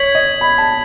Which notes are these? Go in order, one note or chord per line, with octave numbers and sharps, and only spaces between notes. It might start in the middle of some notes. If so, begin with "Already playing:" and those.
Already playing: C#5 G#6 B6 F#7
D#5
B5
A5